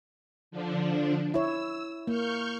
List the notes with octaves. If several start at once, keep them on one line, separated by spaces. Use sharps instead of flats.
D3 F3 D4
E4 C#5 E6
A#3 C#6 F6 G6